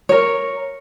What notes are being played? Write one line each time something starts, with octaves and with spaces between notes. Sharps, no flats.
A#4 C#5